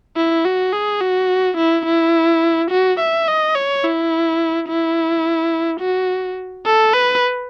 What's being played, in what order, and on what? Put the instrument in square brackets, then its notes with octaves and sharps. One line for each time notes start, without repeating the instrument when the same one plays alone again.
[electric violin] E4
F#4
G#4
F#4
E4
E4
F#4
E5
D#5
C#5
E4
E4
F#4
A4
B4